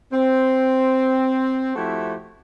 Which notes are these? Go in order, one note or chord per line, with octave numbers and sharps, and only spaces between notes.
C4
F3 A3 E4 F#4 G4 C5